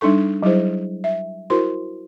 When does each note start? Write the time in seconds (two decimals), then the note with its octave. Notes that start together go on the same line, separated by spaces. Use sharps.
0.01 G3 D4 D#4 A4 C#6
0.43 F#3 G3 E4 G#4 C5
1.04 E5
1.50 E4 F#4 A#4 C5 C6